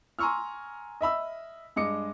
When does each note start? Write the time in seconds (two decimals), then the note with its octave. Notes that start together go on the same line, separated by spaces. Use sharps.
0.19 G#5 A#5 C6 C#6 E6 F6
1.01 D#5 E5 B5 E6
1.76 G2 G#3 D#5 D6 C#7